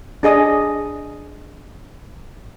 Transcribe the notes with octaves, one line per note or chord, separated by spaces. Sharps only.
D4 G#4 D#5 D#6